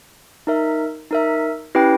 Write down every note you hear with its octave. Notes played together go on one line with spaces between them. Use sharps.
D#4 A#4 E5
D#4 A#4 E5
C#4 E4 G4 B4 G5